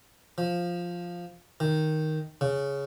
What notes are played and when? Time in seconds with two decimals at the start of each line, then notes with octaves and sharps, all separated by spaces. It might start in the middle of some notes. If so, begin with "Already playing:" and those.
0.38 F3
1.60 D#3
2.41 C#3